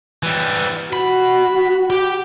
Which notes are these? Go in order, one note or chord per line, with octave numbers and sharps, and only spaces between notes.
E3 G3
F#4 B5
G4